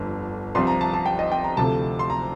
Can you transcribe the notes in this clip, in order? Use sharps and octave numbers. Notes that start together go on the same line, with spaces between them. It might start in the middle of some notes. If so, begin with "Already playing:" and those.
Already playing: G1 F2 D3
C2 C3 F3 C4 C6
A#5
A5
A5
G5
D#5
G5
A#5
D2 C3 F3 A3 A5
C6
A#5